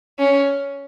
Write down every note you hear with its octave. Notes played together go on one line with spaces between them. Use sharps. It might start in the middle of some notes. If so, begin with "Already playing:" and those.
C#4